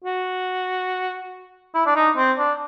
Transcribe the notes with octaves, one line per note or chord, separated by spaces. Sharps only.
F#4
E4
D4
D#4
C4
D4